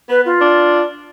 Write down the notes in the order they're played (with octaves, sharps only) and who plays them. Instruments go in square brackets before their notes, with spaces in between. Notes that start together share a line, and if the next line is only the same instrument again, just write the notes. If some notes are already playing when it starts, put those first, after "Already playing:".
[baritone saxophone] B3 [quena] B4
[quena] F4
[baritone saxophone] D4